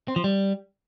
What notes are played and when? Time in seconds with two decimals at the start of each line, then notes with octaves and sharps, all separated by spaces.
0.08 C4
0.16 F3
0.24 G3